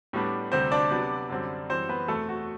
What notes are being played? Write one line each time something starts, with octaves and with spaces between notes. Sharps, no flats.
A2 G3 B3 D4
D2 C3 G3 C4 C5
D4 D5
C3 F#3 B3 D4
F#2 D3 G3 C4
F#2 E3 G3 C4 C5
B3 B4
E2 B2 A3 C4 A4
F#4